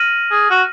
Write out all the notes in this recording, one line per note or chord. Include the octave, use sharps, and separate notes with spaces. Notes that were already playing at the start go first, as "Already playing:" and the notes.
Already playing: F6 A#6 D#7 F#7
G#4
F#4